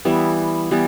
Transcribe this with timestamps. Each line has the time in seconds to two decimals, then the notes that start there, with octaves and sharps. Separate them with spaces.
0.05 E3 G3 B3 E4
0.71 E3 G3 B3